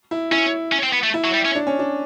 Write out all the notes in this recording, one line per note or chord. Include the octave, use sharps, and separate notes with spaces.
E4
C#4 E4
C#4
C4
B3
A3
E4
F#3
G3
C#4
D4
C#4
D4